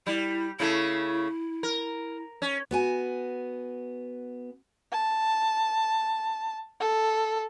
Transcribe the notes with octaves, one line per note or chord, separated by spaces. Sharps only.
G3 E4
C#3 A3 E4
A#4
C#4
B3 F#4 G#5
A5
A4